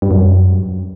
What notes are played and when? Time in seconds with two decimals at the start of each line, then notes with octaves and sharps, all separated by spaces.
0.02 G2
0.11 F#2